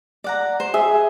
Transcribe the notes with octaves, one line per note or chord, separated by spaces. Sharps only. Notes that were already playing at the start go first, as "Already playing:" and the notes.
D5 F#5 A#5
C5
G#4 E5